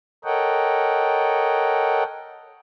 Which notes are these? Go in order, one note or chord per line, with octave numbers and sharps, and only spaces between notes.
A4 A#4 C#5 D#5 F#5 G5